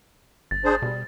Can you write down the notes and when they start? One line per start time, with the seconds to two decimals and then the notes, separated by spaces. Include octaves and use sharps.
0.51 G1 A6
0.65 D4 G#4 C5
0.82 B2 G3